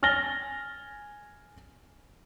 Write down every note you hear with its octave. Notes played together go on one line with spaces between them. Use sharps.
G#5 F6 A6 A#6 G7